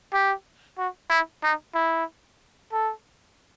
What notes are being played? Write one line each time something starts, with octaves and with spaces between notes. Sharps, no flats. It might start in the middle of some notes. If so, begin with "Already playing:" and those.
G4
F#4
E4
D#4
E4
A4